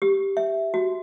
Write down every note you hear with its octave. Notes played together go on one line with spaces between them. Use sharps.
G4
E5
F#4